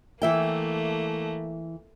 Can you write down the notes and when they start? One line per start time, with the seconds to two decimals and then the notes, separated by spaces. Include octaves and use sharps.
0.22 E3 A3 A#3 E5 G5